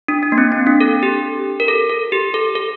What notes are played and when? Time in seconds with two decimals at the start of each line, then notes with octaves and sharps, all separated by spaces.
0.08 D4
0.23 D4
0.32 A#3
0.38 C4
0.52 C4
0.67 D4
0.81 A4
1.03 G4
1.60 A#4
1.68 A4
1.89 A4
2.12 G4
2.34 A4
2.55 A4